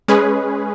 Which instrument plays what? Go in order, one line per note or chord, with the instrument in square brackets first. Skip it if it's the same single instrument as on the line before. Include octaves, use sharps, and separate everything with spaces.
[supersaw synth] G#3 C#4 G#4 B4